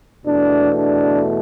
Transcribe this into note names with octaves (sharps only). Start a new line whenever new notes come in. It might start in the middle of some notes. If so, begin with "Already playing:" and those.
E2 B2 A3 D4
D4